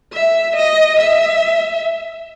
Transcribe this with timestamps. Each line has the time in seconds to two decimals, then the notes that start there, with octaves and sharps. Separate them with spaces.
0.13 E5
0.56 D#5
0.99 E5